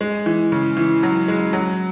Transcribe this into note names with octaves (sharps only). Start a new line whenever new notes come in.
G#3
E3
C#3
E3
F#3
G#3
F#3